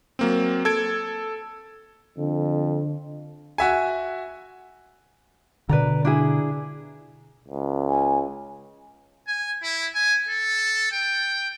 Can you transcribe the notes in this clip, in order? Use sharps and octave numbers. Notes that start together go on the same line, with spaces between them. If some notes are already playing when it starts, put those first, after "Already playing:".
F#3 A#3 C4
A4 G#6 D7
F2 D3
F#4 E5 G#5
B2 D3 B4 D5 A#5
D4 E4 G#4
C#2
G#5
G#5
E4
G#5
A4
G5